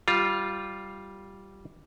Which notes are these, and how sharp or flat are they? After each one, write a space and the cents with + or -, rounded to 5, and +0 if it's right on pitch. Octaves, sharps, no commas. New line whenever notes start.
G3 -10 F4 +0